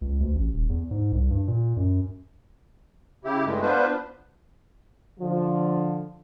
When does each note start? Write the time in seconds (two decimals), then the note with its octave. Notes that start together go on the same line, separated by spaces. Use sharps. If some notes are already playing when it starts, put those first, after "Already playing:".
0.01 C#2
0.20 D2
0.35 A1
0.54 D#1
0.69 E2
0.91 G#2
1.12 C2
1.31 G2
1.48 A#2
1.77 F#2
3.25 C#3 E4 G4
3.45 G2 G#3 A3
3.62 B3 D4 F4 B4 C5
5.20 D3 F3